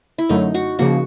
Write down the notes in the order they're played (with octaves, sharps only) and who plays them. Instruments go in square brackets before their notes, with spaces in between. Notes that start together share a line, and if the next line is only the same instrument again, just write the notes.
[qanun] E4
[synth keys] F#2 D3 F#3 A3 [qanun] D#4
[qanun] F#4
[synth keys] C#3 F3 A#3 [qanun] F#4